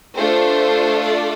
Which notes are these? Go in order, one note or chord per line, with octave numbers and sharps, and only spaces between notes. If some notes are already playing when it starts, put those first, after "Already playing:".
A3 D4 F4 A4 C5
D5